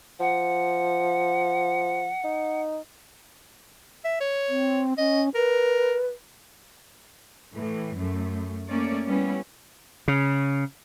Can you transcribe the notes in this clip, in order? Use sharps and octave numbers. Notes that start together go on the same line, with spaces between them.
F3 F#5
D#4
E5
C#5
C4
C#4 D#5
A#4 B4
A2 E3
F#2 A3
A3 A#3 C#4 C#5 D5
G3 B3 C#4 E4
C#3